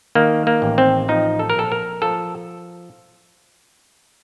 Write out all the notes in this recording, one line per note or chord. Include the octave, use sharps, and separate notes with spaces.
D#3 A#3
A#3
A1
C4
F3 D#4
A4
A#4
A#1 A4
A#4
F3 A4